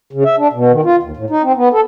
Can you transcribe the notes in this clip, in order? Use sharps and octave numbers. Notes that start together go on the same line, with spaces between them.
C#3
E5
D4
B2
D#3
F4
D#2
A2
D#4
C4
B3
A4